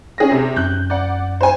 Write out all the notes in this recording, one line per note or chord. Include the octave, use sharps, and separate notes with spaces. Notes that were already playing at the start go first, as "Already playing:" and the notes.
C#4 G#4 A#6
C3
F#2 F#6 G6
D5 F#5
C5 G#5